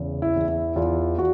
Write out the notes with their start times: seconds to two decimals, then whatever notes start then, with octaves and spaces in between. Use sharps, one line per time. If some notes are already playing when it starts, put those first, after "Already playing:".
Already playing: E2 C#3
0.22 E4
0.36 E2
0.48 E4
0.76 E2 F4
1.19 F#4